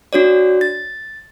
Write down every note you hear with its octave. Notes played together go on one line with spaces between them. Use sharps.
D4 F#4 C#5 D5
A6